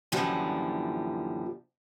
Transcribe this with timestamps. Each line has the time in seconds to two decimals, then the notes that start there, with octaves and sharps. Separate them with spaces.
0.12 F#2 A#2 D3 E3 F3 G3